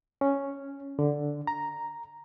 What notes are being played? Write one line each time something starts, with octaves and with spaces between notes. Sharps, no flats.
C#4
D3
A#5